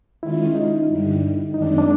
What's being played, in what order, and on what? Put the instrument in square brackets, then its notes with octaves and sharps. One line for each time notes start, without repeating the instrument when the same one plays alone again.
[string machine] D#3 G#3 C#4 F4 [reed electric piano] E4
[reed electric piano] D#4
[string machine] G2 D3 G3
[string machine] F#2 D#3 G#3 C4 [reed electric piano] D#4
[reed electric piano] D4
D4